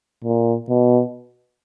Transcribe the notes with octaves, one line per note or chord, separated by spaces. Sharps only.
A#2
B2